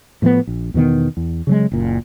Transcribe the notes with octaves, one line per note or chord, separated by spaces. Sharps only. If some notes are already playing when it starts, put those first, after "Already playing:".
A2 F3 A3 B3
A#1
E2 B2 D#3 B3
E2
C#3 F#3 G#3
F#1 A#2